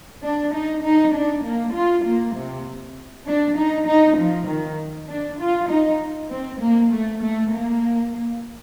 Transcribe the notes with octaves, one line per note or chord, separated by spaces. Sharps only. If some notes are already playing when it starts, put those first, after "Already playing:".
D4
D#4
D#4
D4
A#3
F4
A#3
C3
D4
D#4
D#4
F3
D#3
D4
F4
D#4
C4
A#3
A3
A3
A#3